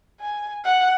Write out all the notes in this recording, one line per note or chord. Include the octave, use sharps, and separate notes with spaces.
G#5
F#5